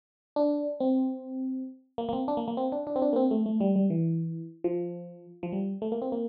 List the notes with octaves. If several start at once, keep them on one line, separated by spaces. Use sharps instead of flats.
D4
C4
A#3
A#3
C4
D4
A#3
A#3
C4
D4
D4
C4
D4
A#3
C4
A3
A3
G3
G3
E3
F3
F3
G3
A3
A#3
C4
A#3